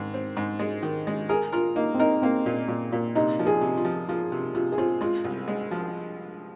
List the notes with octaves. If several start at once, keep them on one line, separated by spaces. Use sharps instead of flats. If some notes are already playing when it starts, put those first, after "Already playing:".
Already playing: G#2 D#3 C4
C4
G#2
G#3
D#3
G#3
G#4 A#4
F4 A#4
A#3 D#4
C4
D#4 A#4
A#3 C4
A#2
A#2
A#2
C3 D#4
F3
G#4
C3
F4
F3
F3 F4
C3
C3 F4
G#4
C4 F4
G#3 F4
C2
G#3
F3